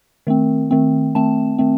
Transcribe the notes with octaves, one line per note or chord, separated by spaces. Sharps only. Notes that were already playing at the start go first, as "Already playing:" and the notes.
D#3 A3 C4
D#3 A3 C4
D#3 A3 C4 A5
D#3 A3 C4